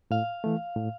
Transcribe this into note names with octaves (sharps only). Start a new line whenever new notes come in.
A2 F5
E3 A3
A2